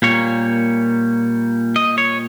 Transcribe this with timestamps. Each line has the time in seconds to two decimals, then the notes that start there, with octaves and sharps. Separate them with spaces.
0.02 A#2 G3 A#3 C#5
1.76 D#5
1.98 C#5